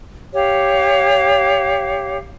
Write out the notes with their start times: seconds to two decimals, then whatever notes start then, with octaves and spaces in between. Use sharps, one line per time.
0.33 G4 C#5 F5